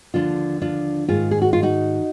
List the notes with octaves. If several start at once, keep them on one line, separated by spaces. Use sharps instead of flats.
D#2 D3 F3 D4 F4
D4 F4
G#2 D#3 F4 G#4
G#4
F#4
F4
D#4 F#4